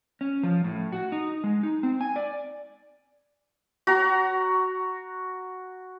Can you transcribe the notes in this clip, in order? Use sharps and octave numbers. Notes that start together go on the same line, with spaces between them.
C#4
F3
A2
F#4
D#4
G#3
D#4
C4
G#5
D5
F#4 A#5